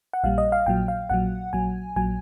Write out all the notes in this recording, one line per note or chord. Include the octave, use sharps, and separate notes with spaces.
F#5
A#1 A#2 G3 F5
D#5
F5
A#1 A#2 F#3 G5
F5
A#1 A#2 F#3 F#5
A#1 A#2 F#3 G#5
A#1 A#2 F#3 G#5